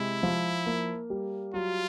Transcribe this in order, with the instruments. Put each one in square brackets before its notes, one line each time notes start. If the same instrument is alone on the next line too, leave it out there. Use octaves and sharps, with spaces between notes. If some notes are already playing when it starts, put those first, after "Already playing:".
Already playing: [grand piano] C3 G#3 [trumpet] E4
[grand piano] F3
A#3
G3
[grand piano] F#3 [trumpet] F4